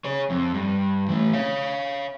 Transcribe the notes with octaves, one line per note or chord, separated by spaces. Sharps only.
G#4 C#5
F2
G2
E3 A3
C#5 F5